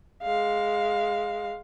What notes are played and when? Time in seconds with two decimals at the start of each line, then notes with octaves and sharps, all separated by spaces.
0.22 G#3 F5